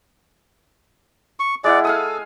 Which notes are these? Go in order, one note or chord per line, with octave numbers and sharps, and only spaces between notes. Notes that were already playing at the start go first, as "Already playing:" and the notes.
C#6
G#3 E4 D5 F#5
A4 F5 G#5 D#6